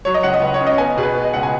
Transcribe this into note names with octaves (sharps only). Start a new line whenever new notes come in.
F#3 C#5
D#5
C#2 F#5
D#5
C#2 B4
C#5
C#3
D#5
B3 G#5
B2 G#4
B4
B3
D#5
C#2 F#5
G#5